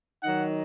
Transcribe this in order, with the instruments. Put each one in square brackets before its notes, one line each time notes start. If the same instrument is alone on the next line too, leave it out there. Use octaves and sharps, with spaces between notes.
[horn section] D#3 F#3 D#4 F#5